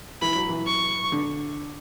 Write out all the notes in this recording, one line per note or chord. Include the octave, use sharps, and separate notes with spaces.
E3 B5
F#3
E3
C#6
D3